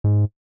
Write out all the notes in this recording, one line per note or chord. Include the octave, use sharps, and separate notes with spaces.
G#2